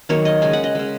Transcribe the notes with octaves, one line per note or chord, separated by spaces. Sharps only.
D#3 F#3 A#3 C#5
D#5
C#3 G#3 G#5
F#5
D#5
C#3 G#3